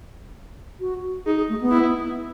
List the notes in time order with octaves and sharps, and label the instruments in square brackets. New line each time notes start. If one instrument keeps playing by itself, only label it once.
[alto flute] F#4
[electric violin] D#4 [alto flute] G#4
[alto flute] G#4
A3
B3
[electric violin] E4